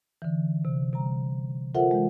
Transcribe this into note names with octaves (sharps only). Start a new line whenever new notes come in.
D3 E3
C3
C3 G3 A#5
F4 A4 A#4 C5 E5 F#5
E3 G#3